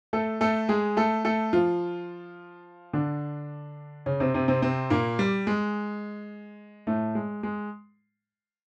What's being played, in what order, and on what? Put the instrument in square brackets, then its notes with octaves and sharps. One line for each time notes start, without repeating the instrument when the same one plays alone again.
[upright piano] A3 A4
A3 A4
G#3 G#4
A3 A4
A3 A4
F3 F4
D3 D4
C#3 C#4
C3 C4
C3 C4
C3 C4
C3 C4
A#2 A#3
G3
G#3
A2 A3
G#3
G#3